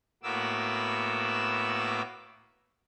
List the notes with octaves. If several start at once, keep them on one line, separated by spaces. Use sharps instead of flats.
A2 A#3 B3 F#4 D6 E6